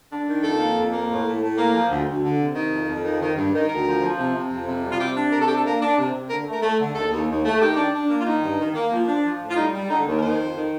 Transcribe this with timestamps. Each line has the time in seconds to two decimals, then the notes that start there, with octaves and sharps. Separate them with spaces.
0.11 D4
0.27 D#3
0.43 F2 A4
0.59 A#3
0.76 F2
0.92 A#3
1.09 A2
1.25 A2
1.41 A2
1.58 A#3
1.74 F3
1.90 D2
2.06 D2
2.23 D3
2.39 C3
2.55 D#3
2.71 F2
2.89 F2
3.04 D#3
3.21 D#3
3.37 G2
3.53 D#3
3.69 D2 A#4
3.86 F3
4.02 F3
4.19 C3
4.35 C3
4.51 F2
4.67 C3
4.84 G3
4.92 F4
5.00 C3 G4
5.16 D4
5.32 C3 A#4
5.40 A4
5.48 D4 G4
5.56 A4
5.65 A#3 A#4
5.82 D4
5.98 C3
6.14 C3
6.30 D3 A#4
6.47 A3 A#4
6.63 A3
6.80 D3
6.95 D#2 A4
7.12 D#2
7.29 D#2
7.45 A3
7.61 D#3 G4
7.77 D4
7.94 D4
8.10 A#3
8.20 F4
8.26 D#3 D#4
8.42 G2
8.59 D#3
8.75 A#3
8.92 F3
9.08 D4
9.24 F3
9.40 A2
9.51 F4
9.56 G3 D#4
9.73 G3
9.89 D3 D#4
10.06 D#2
10.17 A#4
10.22 D#3 C5
10.39 F2
10.54 D#3